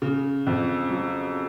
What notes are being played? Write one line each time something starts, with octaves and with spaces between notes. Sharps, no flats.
C#3
F2
F#3